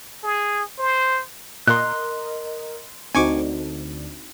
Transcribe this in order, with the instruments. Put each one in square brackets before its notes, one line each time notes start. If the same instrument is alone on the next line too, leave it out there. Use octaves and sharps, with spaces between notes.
[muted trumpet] G#4
C5
[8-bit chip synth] A#2 [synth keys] A#4 D#5 [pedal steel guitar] C6 F#6
[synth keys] D2 D4 [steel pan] C4 D#4 F#4 [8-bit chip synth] G#5 C#6 D6